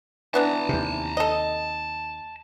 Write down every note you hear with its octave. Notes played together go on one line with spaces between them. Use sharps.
E3 B3 D4 A5 A#5
D#2 C3
A4 D#5